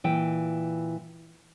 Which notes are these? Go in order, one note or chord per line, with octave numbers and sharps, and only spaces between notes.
A#2 E3 G5